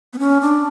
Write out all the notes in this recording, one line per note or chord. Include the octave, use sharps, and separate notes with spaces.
B3
C#4
D4